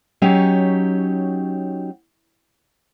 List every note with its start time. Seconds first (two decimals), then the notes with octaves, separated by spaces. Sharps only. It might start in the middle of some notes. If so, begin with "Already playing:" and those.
0.22 F#3 C#4 D#4 G4 C#5